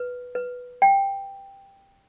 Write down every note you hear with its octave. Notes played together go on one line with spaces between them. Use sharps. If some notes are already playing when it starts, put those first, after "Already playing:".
Already playing: B4
B4
G5